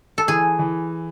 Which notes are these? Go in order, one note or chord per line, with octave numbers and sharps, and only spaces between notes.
A4
E3 G#4
E3